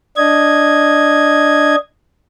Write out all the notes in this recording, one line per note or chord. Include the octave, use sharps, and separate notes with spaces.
D4 D#5 G#6